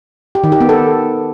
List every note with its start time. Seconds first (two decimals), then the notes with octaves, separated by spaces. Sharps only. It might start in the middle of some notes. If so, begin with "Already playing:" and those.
0.35 G4
0.44 D#3
0.52 G4
0.61 B3
0.69 A4